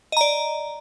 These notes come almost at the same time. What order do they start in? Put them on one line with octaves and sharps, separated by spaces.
D#5 A#5 D5